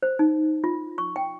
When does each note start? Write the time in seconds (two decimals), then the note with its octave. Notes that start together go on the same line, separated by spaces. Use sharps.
0.03 C5
0.19 D#4
0.64 F4
0.98 C#6
1.16 G5